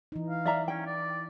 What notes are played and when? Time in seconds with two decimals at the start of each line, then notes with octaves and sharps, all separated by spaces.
0.12 E3 D#4
0.30 F5
0.45 D5 E5 A#5
0.68 C#4 G5
0.86 D5